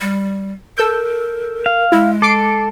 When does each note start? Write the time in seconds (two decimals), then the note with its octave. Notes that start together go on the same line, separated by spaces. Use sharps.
0.01 G3
0.78 A4 A#4 E6 G6
1.66 F5
1.92 G#3 E4
2.22 A4 D6 C7 D7